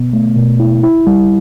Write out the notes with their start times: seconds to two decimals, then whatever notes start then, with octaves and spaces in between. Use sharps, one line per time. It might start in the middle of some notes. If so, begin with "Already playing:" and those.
Already playing: B2 B3
0.13 A3
0.36 B2
0.60 E4
0.83 E4
1.07 G3